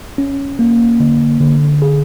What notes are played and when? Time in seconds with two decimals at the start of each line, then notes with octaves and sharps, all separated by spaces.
0.18 C#4
0.59 A#3
1.00 D3
1.40 D3
1.82 G#4